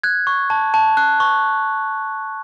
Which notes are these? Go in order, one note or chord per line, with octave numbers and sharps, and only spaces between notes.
F#6 G#6
C#6
A5
A5
F#6
C#6